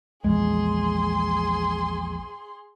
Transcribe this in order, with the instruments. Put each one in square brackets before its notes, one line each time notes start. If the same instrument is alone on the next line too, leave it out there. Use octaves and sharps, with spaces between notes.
[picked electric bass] A#1 E2 G#3 [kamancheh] G#4 C6